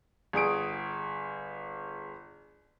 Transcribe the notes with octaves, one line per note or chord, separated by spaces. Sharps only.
G1 G#4 D#6 D7